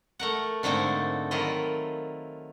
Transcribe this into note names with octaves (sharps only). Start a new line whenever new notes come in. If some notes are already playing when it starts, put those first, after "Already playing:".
A3 A#4 F#5
G#2 D3 A3 A#3 C4
D#3 F#3 E4 F4 D#5